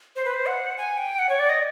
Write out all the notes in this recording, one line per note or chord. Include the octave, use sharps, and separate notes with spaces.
C5
B4
C5
F#5
G#5
G5
F#5
C#5
D5
D#5